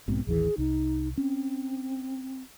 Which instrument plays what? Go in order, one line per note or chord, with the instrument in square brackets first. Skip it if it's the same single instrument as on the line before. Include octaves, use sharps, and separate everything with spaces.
[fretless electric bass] B1 G#2 B2 [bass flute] C4
[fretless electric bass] A1 D#2 E3 [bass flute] G#4
[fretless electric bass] C2 [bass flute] D#4
[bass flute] C4 [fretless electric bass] C#4